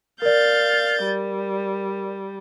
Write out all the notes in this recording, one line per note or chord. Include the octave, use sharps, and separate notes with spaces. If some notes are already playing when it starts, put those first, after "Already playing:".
A#4 D5 F5 G6 A6
G3